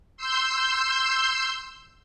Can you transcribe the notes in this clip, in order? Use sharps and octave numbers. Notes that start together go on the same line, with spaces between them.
C6 E6 G6